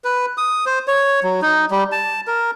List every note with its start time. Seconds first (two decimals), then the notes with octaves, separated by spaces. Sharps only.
0.04 B4
0.38 D#6
0.66 C5
0.87 C#5
1.23 F#3
1.42 D#4
1.71 G3
1.92 A5
2.27 A#4